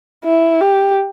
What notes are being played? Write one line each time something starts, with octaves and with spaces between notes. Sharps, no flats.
E4
G4